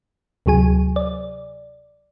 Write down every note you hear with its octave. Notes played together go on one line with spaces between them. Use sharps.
D2 C3 F#3 G#4 G#5
D5